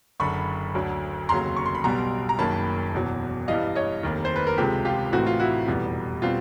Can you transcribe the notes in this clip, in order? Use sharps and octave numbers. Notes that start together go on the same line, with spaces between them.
F#1 F#2 D3 B5 C#6
D2 D3 F#3
F1 D#2 C#3 F#3 A#5 C6
C#6
C6
B5
B1 B2 G3 A#5 C6
A#5
F#1 F#2 D#3 F#3 A#3 A5 B5
E1 E2 B2 F#3
G2 E3 G3 D#5 F5
C#5 D#5
F1 D#2 D#3
C5
B4
A#4
C#2 C3 F3 G#3 G4 A4
F4 G4
A1 A2 E3 A3 C4 F#4
F4
E4 F#4
F1 E2 B2 G3
B2 G3 C4 F4